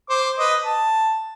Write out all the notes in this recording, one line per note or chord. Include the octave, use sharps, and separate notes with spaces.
C5 D6
B4 D#5
A5